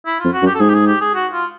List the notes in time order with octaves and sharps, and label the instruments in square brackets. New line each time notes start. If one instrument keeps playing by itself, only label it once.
[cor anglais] E4
[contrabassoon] F2 [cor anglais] F4
[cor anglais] F#4
[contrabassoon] F#2
[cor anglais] G4
A4
[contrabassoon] G#2 [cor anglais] G#4
[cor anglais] G4
G#4
G4
G#4
F#4
F4